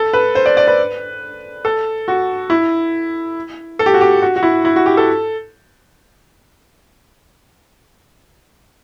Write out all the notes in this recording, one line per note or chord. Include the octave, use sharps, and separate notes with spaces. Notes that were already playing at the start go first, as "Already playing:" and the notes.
Already playing: A4
B4
C5
D5
D5
B4
A4
F#4
E4
A4
G4
F#4
G4
F#4
F#4
E4
E4
F#4
G4
A4